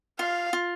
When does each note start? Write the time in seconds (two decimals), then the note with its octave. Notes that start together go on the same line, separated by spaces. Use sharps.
0.19 F4 F5
0.53 F4